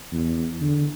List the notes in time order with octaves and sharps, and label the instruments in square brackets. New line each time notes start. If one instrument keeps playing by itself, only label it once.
[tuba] E2
D3